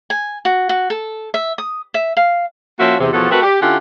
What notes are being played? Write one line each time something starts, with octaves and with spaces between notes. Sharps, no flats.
G#5
F#4
F#4
A4
E5
D#6
E5
F5
F3 A#3 C#4 F#4 C5 E5
E2 C3
E2 B2 F3 A4 C#5 F#5
A3 C4 F#4 A#4 B4
G4
D3 C#4 E4 F4 G4 F#5